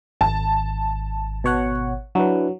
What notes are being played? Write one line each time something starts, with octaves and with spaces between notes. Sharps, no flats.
G#1 A5
B2 C#5 F#5
F#3 D4 E4 B4